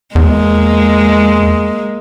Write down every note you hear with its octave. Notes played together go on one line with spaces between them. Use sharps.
E2 G#3 A#3